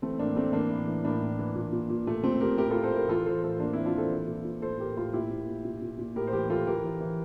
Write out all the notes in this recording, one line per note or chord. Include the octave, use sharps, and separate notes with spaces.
E3 A3 C4
A2 A#3 D4
A2 A3 C4
E3 A#3 D4
A2
E3
A2 A#3 D4
A2
E3
A#2
A#2
A#2
A#2 A3
A#2 A3 C4
A#2 G4 A#4
A2 G4 A#4
A2 F4 A4
A4 C5
A2 G4 A#4
E3 F4 A4
E3 A4 C5
A2 A4 C5
E3 A#3 D4
E3 C4 E4
D4 F4
E3 A4 C5
A#2
A#2
A#2
A2 A4 C5
A2 G4 A#4
A2 F4 A4
A#2 E4 G4
A#2
A#2
A#2
A#2
A#2
A2 G4 A#4
C5
E3 G4 A#4
E3 F4 A4
E3 G4 A#4
E3
E3